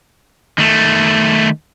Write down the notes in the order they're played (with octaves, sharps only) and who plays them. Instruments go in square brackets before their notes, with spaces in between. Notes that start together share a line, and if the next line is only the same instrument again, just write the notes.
[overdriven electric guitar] D#3 A3